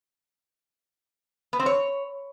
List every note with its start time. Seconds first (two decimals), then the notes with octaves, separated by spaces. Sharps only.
1.53 B3
1.60 C4
1.66 C#5